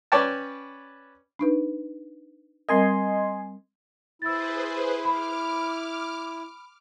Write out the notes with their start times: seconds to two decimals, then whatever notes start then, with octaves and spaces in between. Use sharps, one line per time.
0.12 C#4 B4 C#5 D5 G5 A5
1.39 D4 D#4 B4
2.69 G3 C4 A#4 D#5 G#5 C6
4.22 E4 G#4 B4 C5 E6 A6
5.05 B5 D6 F6